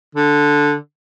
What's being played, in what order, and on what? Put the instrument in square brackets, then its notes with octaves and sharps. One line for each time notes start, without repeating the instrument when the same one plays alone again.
[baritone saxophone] D3